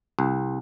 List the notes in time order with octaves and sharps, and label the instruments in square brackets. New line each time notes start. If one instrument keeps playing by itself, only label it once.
[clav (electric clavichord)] C2